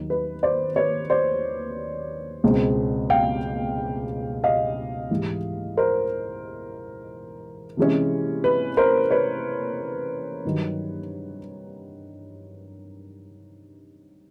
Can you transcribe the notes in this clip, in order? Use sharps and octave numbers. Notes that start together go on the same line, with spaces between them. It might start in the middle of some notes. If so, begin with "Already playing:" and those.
Already playing: D#2 D#3 F#3
B4
C5 D5
B4 C#5
C5 D5
C#2 B2 G#3 C4
F5 G5
D#5 F5
G#2 E3 G3
A#4 C5
C3 E3 G#3 C#4
B4
A#4 C5
B4 C#5
G2 D#3 F#3